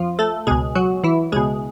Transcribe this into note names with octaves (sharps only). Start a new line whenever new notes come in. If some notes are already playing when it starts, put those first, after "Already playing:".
Already playing: F2 F3 F4
A3 A4
C#2 B2 G#3 G#4
F#3 F#4
E3 E4
C#2 B2 G#3 G#4